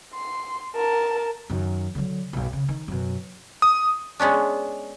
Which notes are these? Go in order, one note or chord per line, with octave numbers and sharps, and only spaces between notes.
C6
A#4 A5
F#2 D#3
D3 F#3
B1 G2
C#3
D#3
F#2 B2
D#6
G#3 B3 C#4 D4